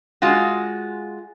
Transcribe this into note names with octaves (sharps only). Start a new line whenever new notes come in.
G#3 F4 F#4